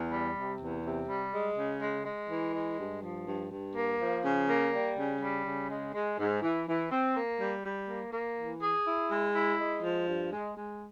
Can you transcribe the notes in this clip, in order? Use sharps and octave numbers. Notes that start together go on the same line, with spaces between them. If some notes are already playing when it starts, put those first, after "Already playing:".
Already playing: E2
G3
C3
E2
C3
G3
G#3
C#3
G#3
G#3
E3
G#3
G2
F3
G2
G2
A#3
F3
C#3
A#3
G3
C#3
G3
C#3
G#3
G#3
G#2
E3
E3
C4
A#3
G3
G3
A#3
A#3
E3
G#4
E4
G#3
E4
G#3
F3
G2
G#3
G#3